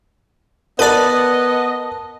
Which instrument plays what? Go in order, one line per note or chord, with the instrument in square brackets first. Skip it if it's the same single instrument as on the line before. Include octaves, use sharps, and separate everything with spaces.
[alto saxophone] B3 [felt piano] A#4 A5 [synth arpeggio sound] B4 D5 [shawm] D#5